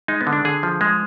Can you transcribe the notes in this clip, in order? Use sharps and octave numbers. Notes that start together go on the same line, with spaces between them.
G#3 D#4
B3
D3
D4
D3 G#4
F3
G#3